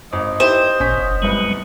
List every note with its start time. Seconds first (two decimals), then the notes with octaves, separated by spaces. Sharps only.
0.13 G#1 D#5
0.40 D#4 E4 G4 C5
0.80 A1 A#2 C#4 G6 B6
0.98 F#1
1.22 G1 C2 F#3 G#3 B4